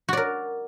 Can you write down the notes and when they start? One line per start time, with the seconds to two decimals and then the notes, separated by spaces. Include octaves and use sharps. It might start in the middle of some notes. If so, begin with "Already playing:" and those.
0.09 F#4
0.13 D5
0.17 A#4